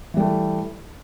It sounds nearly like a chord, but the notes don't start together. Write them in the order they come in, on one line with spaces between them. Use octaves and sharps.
E3 G3 A3